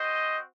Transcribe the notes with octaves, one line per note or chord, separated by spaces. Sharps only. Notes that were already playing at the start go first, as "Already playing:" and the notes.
Already playing: C4 F#4 C5 D#5